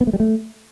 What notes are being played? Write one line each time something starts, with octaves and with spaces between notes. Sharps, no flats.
B3
A3
G3
A3